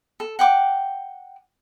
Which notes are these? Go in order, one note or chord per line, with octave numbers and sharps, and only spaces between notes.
A4
F#5 G5 D6